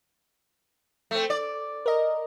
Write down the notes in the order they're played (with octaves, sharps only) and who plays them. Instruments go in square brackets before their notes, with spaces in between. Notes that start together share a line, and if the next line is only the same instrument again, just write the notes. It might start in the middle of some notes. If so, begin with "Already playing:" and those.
[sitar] A3 C4
D5
[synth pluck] A#4 D#5